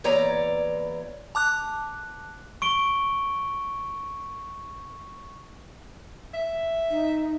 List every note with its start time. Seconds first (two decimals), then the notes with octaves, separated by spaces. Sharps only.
0.04 E2 A#2 E3 C#5 D5 A#5
1.35 A5 D6 F#6
2.62 C#6 D7 G7
6.34 E5
6.90 D#4